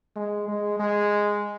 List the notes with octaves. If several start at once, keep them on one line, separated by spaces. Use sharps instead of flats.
G#3
G#3
G#3